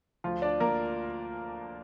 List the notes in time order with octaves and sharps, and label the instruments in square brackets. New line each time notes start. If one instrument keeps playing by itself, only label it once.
[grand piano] D2 F3 F4
D4 D5
D2 A#3 A#4